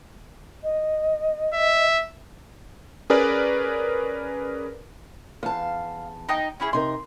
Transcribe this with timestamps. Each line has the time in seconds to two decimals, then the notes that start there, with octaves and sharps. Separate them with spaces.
0.63 D#5
1.54 E5
3.10 C#4 G#4 A#4 B4 D5
5.43 E2 F5 A5
6.29 D#4 D#5 G5
6.60 C#4 E4 G#4
6.73 C3 D#4 A#4 C6